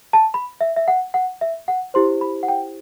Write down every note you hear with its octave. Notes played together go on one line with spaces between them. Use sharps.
A5
B5
E5
E5
F#5
F#5
E5
F#5
E4 G4 C5 C6
B5
F#5
G5